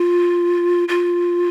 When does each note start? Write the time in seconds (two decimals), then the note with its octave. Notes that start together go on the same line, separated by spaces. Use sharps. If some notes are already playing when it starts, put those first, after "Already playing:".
Already playing: F4
0.88 F4